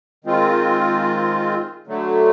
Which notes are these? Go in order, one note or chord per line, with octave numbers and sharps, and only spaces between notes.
D#3 G#3 C4 F4
D3 F#3 A3